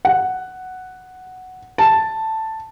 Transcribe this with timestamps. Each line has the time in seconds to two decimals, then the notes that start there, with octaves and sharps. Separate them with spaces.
0.05 F#5
1.78 A5